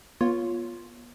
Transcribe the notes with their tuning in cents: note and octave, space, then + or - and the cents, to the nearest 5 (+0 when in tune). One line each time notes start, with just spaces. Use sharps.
B3 -35 F4 +0 C#5 +0